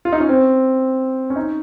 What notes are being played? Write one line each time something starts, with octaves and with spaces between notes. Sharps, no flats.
F4
D#4
C#4
C4
C#4
D#4